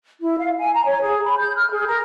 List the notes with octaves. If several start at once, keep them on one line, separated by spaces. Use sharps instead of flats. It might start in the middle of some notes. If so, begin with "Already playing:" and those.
E4
F5
G#5
A#5
C#5
G#4
B5
G6
F6
G#4
A#4